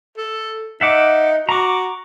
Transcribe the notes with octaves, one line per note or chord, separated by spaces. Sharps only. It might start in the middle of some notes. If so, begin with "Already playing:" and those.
A4
D#4 E5 F#5 D6
F#4 A#5 D6